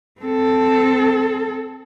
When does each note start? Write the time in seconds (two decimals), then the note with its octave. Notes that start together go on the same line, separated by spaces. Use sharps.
0.21 C4 A4